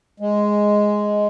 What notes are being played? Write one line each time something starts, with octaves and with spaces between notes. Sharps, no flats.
G#3